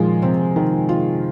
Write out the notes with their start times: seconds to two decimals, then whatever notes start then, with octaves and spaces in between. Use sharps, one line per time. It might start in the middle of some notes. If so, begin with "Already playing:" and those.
Already playing: A#2 D#3 F3 G#3 C#4 F4
0.22 C3 C4
0.56 D#3
0.89 F4